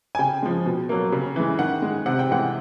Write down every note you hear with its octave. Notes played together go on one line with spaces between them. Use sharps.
G#5
C#3 G5
F3 G#3
B2
F#3 A#3
C#3
E3 G#3
D#3 F#5
G#3
C3 F#5
G5
E3 G#3 F#5